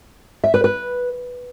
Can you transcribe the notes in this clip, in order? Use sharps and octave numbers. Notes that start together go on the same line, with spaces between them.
E5
B4
B4